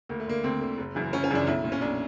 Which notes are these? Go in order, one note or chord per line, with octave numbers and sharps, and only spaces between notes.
D2 A#3
A3
D3 A#3
D2 C4
D3
F#1
F#2 C#3 E3
F#1 C#4
C#4
F#2 C#3 E3 D4
B1 E4
A#2
C#4
B1 D4